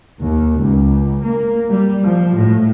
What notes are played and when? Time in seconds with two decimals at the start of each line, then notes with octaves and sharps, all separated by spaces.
0.20 D#2
0.58 C#2
1.23 A#3
1.69 G3
2.03 F3
2.35 A2